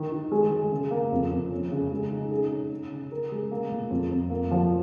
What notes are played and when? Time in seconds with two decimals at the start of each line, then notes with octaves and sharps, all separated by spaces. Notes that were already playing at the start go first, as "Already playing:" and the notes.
Already playing: D#3
0.12 D#3
0.32 G#3
0.51 G#3
0.72 C#3
0.91 A#3
1.12 F2
1.31 F2
1.51 C#4
1.71 C#3
1.92 G#3
2.11 D#4
2.31 G#4
2.52 C#4
2.71 C#4
2.92 C#3
3.12 A#4
3.32 G#3
3.51 A#3
3.71 A#2
3.90 F2
4.11 F2
4.30 A#3
4.51 F3